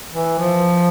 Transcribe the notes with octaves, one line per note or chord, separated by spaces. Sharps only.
E3
F3